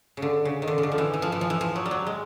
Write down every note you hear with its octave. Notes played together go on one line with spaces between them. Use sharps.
C#3
D3
C#3
D#3
D3
C#3
D3
F3
E3
E3
F3
E3
F3
E3
F3
F#3
G3
F#3
G#3